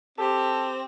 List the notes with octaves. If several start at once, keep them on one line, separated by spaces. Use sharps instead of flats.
C4 G4 A4